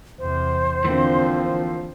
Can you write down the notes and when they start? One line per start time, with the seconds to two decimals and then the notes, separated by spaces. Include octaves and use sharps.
0.19 E2 C3 C5
0.85 D3 E3 F3 A#3 C4